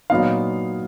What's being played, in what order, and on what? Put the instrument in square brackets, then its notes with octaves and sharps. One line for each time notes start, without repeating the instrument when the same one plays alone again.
[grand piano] A#2 F#3 B3 D#4 F5